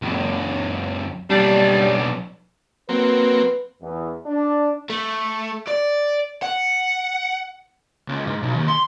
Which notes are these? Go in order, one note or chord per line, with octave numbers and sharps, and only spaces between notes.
C#2 F#2
B1 G3 D4
F#3 A#3 C4 B4
E2
D4
A3
D5
F#5
C#2
G#2
B1
D#2
C6